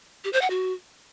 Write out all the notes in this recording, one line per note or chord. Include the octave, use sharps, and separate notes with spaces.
G4
C5
F#5
F#4